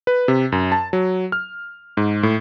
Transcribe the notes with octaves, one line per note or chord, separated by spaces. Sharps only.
B4
C3
F#2
A5
F#3
F6
G#2
A2